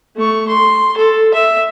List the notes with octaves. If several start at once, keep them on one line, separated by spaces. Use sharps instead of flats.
A3 C#6
C6
A4
E5